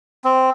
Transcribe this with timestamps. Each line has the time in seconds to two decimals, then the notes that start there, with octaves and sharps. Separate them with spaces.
0.24 C4